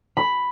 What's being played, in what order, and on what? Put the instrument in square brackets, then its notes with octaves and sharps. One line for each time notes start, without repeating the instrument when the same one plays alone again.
[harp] B5